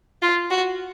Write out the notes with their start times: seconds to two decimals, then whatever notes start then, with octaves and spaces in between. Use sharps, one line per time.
0.22 F4
0.50 F#4